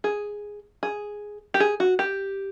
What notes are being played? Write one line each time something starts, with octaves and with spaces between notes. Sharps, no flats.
G#4
G#4
G4
G#4
F#4
G4